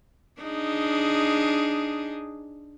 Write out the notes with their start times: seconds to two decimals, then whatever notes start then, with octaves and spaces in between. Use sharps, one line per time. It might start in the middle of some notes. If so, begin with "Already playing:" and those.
0.41 D4 D#4 G#4